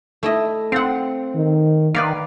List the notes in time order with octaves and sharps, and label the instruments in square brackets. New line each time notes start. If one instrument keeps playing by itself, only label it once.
[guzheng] A3 E4 D#5
[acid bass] C4 [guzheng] F5 F#5
[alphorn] D#3
[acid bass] D#3 [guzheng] B4 D5 F5